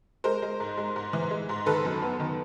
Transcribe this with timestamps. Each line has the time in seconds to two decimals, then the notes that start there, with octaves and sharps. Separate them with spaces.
0.24 G#3 A#4 C5
0.42 G#3
0.60 G#2
0.78 G#3
0.96 G#2
1.13 E3
1.31 G#3
1.49 G#2
1.66 D#3 A4 B4
1.85 F#2
2.02 B3
2.20 D#3